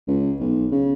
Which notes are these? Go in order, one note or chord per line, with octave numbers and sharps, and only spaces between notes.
C#2
B1
C#3